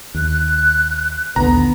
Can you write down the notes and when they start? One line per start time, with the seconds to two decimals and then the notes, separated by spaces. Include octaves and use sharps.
0.14 D#2 F#6
1.36 A#1 D#2 D3 B3 A#5